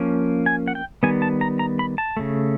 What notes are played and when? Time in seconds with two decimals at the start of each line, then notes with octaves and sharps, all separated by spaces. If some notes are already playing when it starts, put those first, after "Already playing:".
Already playing: F3 A#3 C#4
0.46 G#5
0.68 F#5
0.75 G5
1.03 D#3 G3 B3 G#5
1.22 A5
1.41 A#5
1.59 A#5
1.79 B5
1.98 A5
2.17 C#3 F3 A3